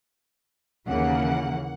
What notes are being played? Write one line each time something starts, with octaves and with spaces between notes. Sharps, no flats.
D#2 C#3 E3 A#3 F#5